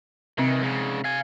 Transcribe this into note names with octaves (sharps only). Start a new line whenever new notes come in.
C3 D#3 E3 C4
G#2 C#3
F5 G#5